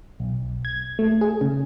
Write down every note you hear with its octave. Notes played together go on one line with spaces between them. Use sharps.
B1
G#6
A3
G#4
C#3